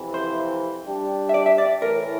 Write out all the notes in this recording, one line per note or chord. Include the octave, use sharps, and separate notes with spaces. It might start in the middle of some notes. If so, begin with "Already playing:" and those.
Already playing: F2 C3 E3
C5
G3 D4 G4
E5
D5
E5
D5
A2 E3 A3 A#4